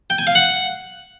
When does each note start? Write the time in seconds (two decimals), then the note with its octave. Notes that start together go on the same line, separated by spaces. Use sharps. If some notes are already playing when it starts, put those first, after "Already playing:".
0.10 G5
0.18 G#5
0.27 F5
0.35 F#5